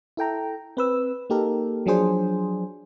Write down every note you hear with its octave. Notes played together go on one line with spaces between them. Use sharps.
E4 A4 G5 A#5
C4 B4 E6
A#3 D#4 G4 A4 A#4
F3 F#3 D4 G#4 C5